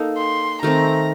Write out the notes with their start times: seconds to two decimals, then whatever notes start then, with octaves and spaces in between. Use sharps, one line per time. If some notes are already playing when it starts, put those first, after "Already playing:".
Already playing: A#3 D#4 A4
0.18 C6
0.62 D#3 A3 C4 A#5